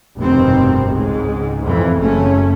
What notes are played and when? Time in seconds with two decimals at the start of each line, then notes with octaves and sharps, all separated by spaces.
0.16 F1 G2 B2 D#3 C4
0.91 C#2 G#2 G#3
1.63 F2 B2 E3
1.98 F#1 F#2 A3 C#4